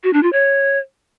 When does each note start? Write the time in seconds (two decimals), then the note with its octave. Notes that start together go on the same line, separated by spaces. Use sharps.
0.04 F#4
0.13 D4
0.23 F4
0.33 C#5